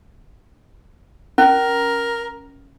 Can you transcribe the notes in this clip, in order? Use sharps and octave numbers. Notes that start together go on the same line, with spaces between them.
C#4 A#4